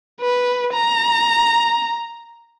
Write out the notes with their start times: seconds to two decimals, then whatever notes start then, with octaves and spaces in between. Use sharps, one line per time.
0.21 B4
0.73 A#5